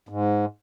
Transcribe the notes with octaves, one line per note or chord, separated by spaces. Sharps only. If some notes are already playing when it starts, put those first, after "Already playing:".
G#2